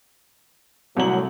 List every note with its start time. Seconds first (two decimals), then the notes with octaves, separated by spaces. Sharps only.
0.97 C2 A2 F#3 F#7